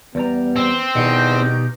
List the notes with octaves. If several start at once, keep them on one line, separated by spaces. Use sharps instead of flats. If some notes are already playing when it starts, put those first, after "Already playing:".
E2 G3 B3 A#5
C4
E2 B2 D#3 G3 D#5 F#5